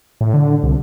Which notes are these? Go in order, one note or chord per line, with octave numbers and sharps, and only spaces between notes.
A2
D3
C2